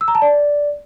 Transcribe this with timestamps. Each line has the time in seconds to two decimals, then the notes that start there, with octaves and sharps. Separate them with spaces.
0.01 E6
0.08 A#5
0.15 A5
0.22 D5